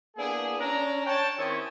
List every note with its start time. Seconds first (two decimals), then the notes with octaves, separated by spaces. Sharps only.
0.17 A#3 B3 D4 E4 G#4
0.59 C#4 D4 A#5
1.06 C#5 G5 A5
1.38 D#3 C4 C#4 E4 G4